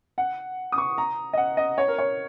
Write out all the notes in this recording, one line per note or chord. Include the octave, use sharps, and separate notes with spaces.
F#5
D#6
C#6
A#5
D#5
F#5
D#5
C#5
A#4
C#5